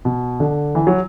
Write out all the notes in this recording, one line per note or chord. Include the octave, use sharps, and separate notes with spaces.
B2
D3
E3
F#3